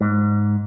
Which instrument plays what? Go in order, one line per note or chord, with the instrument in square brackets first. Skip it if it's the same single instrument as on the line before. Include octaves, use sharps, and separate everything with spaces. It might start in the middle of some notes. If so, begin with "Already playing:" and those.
[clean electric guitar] G#2